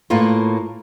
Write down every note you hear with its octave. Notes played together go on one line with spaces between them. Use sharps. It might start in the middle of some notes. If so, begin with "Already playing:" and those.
A2 A#3 F4 A#4 B4